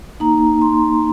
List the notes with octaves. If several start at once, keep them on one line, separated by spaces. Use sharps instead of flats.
A#3 D#4 A#5
C6